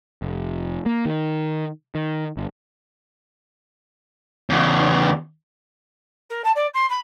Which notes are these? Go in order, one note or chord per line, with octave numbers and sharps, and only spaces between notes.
F1
A#3
D#3
D#3
G1
E2 C#3
A#4
A5
D5
C6
B5